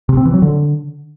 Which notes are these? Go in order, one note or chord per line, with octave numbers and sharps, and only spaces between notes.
C3
C4
E3
F#3
D3